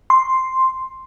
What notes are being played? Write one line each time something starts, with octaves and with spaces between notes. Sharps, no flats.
C6